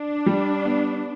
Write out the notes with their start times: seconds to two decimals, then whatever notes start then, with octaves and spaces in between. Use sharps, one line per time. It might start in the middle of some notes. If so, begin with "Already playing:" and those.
Already playing: D4
0.26 G3
0.65 B3